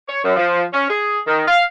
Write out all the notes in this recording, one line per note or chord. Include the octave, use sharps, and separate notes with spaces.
C#5
F#2
F3
C#4
G#4
D#3
F5